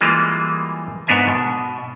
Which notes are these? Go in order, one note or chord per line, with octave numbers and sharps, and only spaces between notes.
E3 G3 G#3 A#3 F4
G#2 B3 D4 A#4 E5 G#5
B2